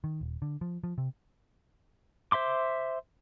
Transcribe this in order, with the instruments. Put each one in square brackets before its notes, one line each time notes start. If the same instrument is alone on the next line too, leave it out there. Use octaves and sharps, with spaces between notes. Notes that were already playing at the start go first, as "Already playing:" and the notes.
[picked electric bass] D#3
D#1
D3
F3
F3
C3
[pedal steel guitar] C5 E5 C6 D6